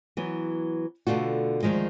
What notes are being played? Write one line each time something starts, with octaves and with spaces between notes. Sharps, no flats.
E3 F#3 B3
B2 D3 A3 F4 F#4
D2 G2 D#3 F3 G#3